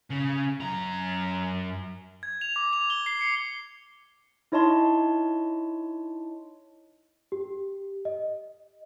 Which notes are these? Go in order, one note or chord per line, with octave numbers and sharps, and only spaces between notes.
C#3
F#2 A#5
G#6
F7
D6
F7
G7
C7
C#7
D#4 E4 C#5 D#5 A5 C6
G4
D#5